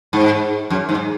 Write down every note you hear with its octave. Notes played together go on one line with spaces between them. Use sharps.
G#2
F#2
G#2